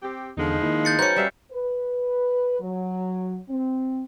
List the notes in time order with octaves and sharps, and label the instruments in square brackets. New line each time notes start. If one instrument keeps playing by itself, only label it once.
[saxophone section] C4 G4
[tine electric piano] E2 D3 [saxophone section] F3 G#3 D#4
[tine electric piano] D#3 A#3 E4
[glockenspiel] G6 A6 C#7
[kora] C#4 F#4 [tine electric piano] B4 C5 A#5 [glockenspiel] G6 C#7
[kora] G3 E5 F5
[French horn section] B4
F#3
C4